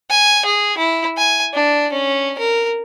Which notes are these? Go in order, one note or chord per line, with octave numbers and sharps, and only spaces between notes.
G#5
G#4
E4
G#5
D4
C#4
A#4